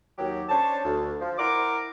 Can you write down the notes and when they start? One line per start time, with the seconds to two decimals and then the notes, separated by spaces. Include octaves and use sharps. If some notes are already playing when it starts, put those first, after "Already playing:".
0.18 D#2 F#3 G4
0.49 C#4 D4 C5 C#5 A5
0.84 D2
1.20 F3
1.38 E4 A#4 F#5 A#5 C6 D6